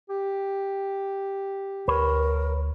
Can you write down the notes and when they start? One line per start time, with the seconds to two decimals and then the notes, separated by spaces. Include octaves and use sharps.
0.09 G4
1.88 D2 A#4 B4 C#5